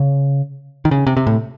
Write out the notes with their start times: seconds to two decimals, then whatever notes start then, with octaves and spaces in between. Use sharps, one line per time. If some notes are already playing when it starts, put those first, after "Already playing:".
Already playing: C#3
0.85 D#3
0.91 C#3
1.07 C3
1.17 C3
1.27 A2